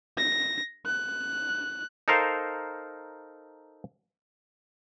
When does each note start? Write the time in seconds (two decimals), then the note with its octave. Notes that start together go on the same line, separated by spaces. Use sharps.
0.18 A#6
0.86 F#6
2.08 D#4 A4 A#4 C5 F5